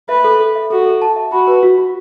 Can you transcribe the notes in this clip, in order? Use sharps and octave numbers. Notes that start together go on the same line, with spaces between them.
B4 E5
A4
A4
E5
F#4 A4
A4
A5
E5
F#4 B5
B4
F#4
F#4